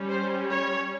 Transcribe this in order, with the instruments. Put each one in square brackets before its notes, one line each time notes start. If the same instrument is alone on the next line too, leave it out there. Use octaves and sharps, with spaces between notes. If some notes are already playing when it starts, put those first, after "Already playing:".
Already playing: [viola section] G3 C#4
C5
C#5